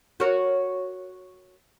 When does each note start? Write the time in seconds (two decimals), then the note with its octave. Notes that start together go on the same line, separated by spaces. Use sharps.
0.20 F#4 A#4 C#5